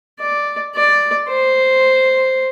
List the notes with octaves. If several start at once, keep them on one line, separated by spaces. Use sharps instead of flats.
D5
D5
C5